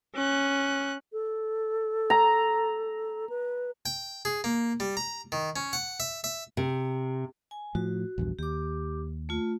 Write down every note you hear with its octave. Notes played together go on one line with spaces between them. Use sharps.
C#4 F#6
A4
A#5
B4
G5
G#4
A#3
G3
A#5
D#3
C#4
F#5
E5
E5
C3
G#5
A2 F3 F#4
A#1 E2 G2
D#2 G4 D6
A3 F4